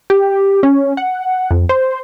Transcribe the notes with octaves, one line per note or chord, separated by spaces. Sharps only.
G4
C#4
F#5
F2
C5